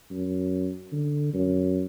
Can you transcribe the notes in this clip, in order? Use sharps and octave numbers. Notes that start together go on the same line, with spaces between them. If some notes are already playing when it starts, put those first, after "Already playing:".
F#2
D3
F#2